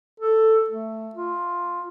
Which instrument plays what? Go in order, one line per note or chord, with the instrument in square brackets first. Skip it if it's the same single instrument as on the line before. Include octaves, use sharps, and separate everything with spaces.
[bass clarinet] A4
A3
F4